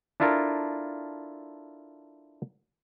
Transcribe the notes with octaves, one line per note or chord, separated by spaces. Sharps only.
D4 E4 F4 A4 A#4